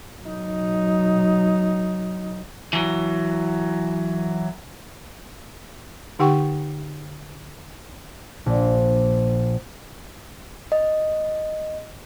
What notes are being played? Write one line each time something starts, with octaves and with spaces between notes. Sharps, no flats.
F#3 D#4
E3 F#3
D3 D#4 G4 F#5 G5 C#6
A#1
D#5